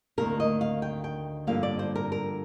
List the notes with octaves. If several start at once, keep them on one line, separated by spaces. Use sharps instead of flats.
D2 C3 D#3 A#3 A#4
D#5
F5
G5
G5
G2 D3 F3 A#3 F5
D5
C5
A#4
A#4